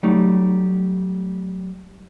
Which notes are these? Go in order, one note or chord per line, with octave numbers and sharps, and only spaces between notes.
F#3 G3 A3 D#4